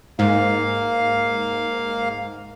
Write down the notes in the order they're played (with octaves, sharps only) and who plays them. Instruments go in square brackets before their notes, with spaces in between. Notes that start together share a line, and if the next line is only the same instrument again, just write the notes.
[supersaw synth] G#2 [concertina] A#3 F5